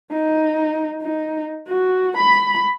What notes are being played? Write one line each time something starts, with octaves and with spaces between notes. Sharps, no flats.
D#4
D#4
F#4
B5